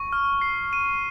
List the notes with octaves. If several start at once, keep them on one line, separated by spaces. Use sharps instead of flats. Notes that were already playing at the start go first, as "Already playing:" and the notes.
Already playing: C#6
F6
C7
D#7